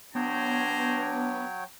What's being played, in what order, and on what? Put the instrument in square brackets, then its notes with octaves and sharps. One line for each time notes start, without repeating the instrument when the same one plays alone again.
[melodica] F#3 C#5 G5 [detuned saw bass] B3 [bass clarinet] D4 [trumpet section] C5 G#5 A#5